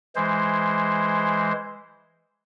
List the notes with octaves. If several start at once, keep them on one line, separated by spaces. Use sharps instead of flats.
E3 G#3 C5